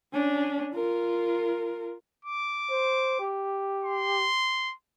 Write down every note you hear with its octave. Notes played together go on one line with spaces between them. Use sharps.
C#4 D4
F4 A#4
D6
C5
G4
C6